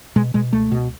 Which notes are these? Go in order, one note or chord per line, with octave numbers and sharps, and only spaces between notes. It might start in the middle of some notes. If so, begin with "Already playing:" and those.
B2 G#3
B2 G#3
C#2 A3
B2